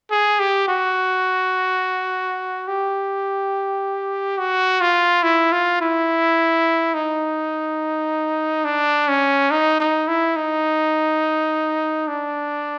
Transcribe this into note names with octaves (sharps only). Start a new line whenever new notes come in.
G#4
G4
F#4
G4
F#4
F4
E4
F4
E4
D#4
D4
C#4
D#4
D#4
E4
D#4
D4